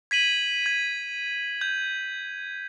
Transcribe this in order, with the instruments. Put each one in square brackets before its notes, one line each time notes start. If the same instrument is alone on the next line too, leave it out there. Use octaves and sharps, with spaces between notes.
[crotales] G#6 B6 D#7 F#7
G#6
G6